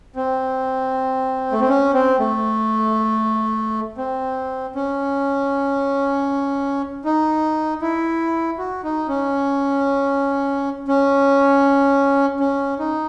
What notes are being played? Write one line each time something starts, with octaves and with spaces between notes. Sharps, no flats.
C4
A3
C4
C#4
C4
A3
C4
C#4
D#4
E4
F#4
D#4
C#4
C#4
C#4
D#4